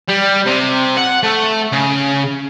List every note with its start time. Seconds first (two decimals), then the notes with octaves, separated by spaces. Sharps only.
0.08 G3
0.46 C3
0.97 F#5
1.23 A3
1.72 C#3